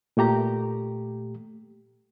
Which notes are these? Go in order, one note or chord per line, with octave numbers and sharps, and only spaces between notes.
A#2 A3 G4 A#5